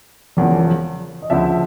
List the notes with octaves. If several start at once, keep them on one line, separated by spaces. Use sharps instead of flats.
E1 E2 C#3 F3
D#5
D2 C#3 F3 E5